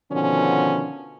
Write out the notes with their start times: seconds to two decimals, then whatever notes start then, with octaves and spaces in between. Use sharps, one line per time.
0.11 B2 D3 D#3 F3 C#4